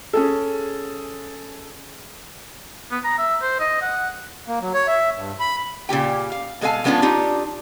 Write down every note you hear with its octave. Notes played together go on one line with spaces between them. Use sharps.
C#4 G#4 A4
B3
A#5
E5
C5
D#5
F#5
A#3
F#3
C#5
E5
G2
B5
A#2 C#3 G4 G5
F5
B2 G#3 A4 D5 F5 G#5
F3 G#3 B3 C#4 D4 F4
D4 D#4 F4 G4